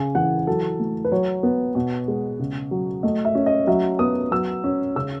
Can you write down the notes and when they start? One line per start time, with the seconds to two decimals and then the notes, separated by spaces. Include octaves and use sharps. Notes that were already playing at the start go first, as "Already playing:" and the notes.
Already playing: C#3 G#5
0.15 E3 F#5
0.47 F#3 A4
0.79 A3
1.05 B4
1.12 F#3 C#5
1.43 B3
1.75 B2
2.08 G#3
2.39 C#3
2.71 F#3
3.03 A3 D#5
3.25 E5
3.35 C#4
3.46 D#5
3.67 F#3 E5
3.99 B3 D#6
4.31 F#3 E6
4.64 C#4
4.96 C#3 E6